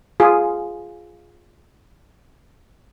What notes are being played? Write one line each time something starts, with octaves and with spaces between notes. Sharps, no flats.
F4 G#4